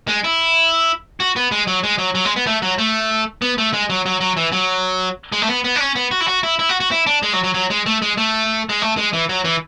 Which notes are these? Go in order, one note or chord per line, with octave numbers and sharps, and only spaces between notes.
G#3
E4
F#4
B3
G#3
F#3
G#3
F#3
F#3
G#3
B3
A3
F#3
A3
B3
A3
G#3
F#3
F#3
F#3
E3
F#3
G#3
A3
B3
B3
D4
C#4
B3
F#4
E4
F#4
E4
E4
F#4
F#4
E4
D4
G#3
F#3
F#3
F#3
G#3
A3
G#3
A3
G#3
A3
G#3
E3
F#3
E3